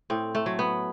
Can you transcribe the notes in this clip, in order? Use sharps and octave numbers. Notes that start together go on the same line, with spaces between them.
A2 C4
A3
F#3
B3